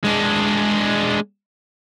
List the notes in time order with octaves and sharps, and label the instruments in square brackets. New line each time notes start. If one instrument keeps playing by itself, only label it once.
[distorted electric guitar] G#3 D4